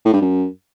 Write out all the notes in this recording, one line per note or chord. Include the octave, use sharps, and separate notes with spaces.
A2
G2
F#2